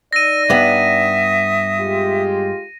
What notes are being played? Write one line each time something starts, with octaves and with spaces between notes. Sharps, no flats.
D#4 D5 E6 A#6 D#7
G2 B3 E5 D#6
G#3 F4 G4